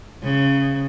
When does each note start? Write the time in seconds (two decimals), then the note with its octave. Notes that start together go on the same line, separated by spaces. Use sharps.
0.23 C#3